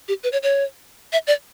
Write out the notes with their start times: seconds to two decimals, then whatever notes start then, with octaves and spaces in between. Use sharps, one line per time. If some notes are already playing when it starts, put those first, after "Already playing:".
0.08 G4
0.23 B4
0.32 C#5
0.43 C#5
1.13 E5
1.27 D5